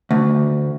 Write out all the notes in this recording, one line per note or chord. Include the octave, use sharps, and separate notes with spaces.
D2